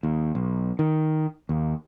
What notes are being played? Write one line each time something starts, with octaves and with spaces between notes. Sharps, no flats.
D#2
B1
D#3
D#2